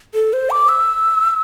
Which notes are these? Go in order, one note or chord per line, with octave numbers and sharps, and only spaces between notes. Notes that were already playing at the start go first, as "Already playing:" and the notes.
A4
C5
D6
E6